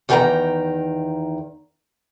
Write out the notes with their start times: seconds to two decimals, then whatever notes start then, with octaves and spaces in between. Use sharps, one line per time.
0.09 E2 D#3 G4 A4 G5 A#5